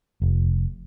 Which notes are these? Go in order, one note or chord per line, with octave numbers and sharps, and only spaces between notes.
F1